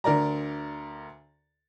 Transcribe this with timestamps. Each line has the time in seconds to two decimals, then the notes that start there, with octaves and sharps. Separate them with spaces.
0.04 D2 A#4 D5 A#5